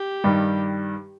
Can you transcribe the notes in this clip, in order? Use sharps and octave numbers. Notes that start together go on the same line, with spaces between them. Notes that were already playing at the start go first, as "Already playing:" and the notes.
Already playing: G4
G2 D#3 G3